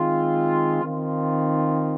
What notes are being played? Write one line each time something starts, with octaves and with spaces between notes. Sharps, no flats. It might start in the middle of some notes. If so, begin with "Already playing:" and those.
Already playing: D#3 G#3 C4 F4
D#3 C4 F4